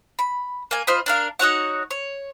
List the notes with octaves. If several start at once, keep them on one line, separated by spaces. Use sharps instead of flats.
B5
A#3 G#5
F4 C5 D#5 B5
D4 A#4 F5
D#4 F#4 C#5 F#5
C#5